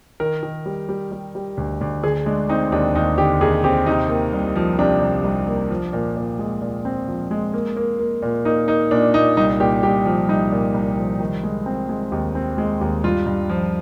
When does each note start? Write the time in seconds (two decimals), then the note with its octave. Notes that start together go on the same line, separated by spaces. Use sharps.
0.20 D#3 A#4
0.43 D#3
0.66 G3
0.89 G3
1.12 G3
1.35 G3
1.57 D2
1.81 D2
2.03 D3 G#4
2.26 G#3 D4
2.49 C4 D#4
2.72 D#2 D4
2.95 D#2 D#4
3.18 D3 G4
3.41 D#2 G#4
3.64 C4 G4
3.86 C3 D#4
4.09 A#3
4.33 C2
4.56 F3
4.79 C3 D4
5.01 C2
5.24 C2
5.47 A#3
5.70 F3
5.93 A#2
6.16 A#2
6.39 G#3
6.62 A#2
6.85 C4
7.08 F3
7.31 G#3
7.54 A#3
7.76 A#3
7.99 A#3
8.22 A#2
8.45 A#3 D#4
8.68 A#3 D#4
8.91 A#2 D4
9.14 A#2 D#4
9.37 C2 D#4
9.60 A#2 G4
9.83 C2 G4
10.06 F3
10.28 C2 D#4
10.52 A#2
10.74 C2
10.98 F3
11.20 D#3
11.44 G#3
11.66 C4
11.89 G#3
12.12 D#2
12.35 C4
12.58 G#3
12.81 D#2
13.04 G2 F4
13.26 G2
13.50 F3